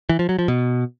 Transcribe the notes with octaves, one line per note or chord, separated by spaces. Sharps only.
E3
F3
F#3
F3
B2